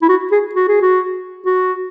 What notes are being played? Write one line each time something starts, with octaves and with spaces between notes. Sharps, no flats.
E4
F#4
G#4
F#4
G#4
F#4
F#4